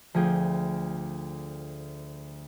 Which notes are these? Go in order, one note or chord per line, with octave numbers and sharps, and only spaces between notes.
D2 F3 G#4 G5